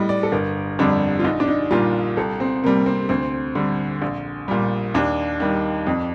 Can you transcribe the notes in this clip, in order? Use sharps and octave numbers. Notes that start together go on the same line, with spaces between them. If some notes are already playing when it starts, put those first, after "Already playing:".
Already playing: A2 G3 D#5
D5
A4
G1 A#4
F2 D3 G3 D4
F4
A#1 D#4
D4
D#4
A#2 G3 F4
C2 A4
C4
C3 G3 A#3
C4
D2 C4
D3 G3
A#1
A#2 G3
D#2 D4
D#3 G3
F2